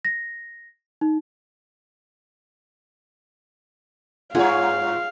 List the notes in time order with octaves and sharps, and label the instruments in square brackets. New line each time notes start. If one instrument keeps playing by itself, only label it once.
[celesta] A#6
D#4
[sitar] G2 C#5 [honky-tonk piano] F4 [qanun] G#4 [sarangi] F5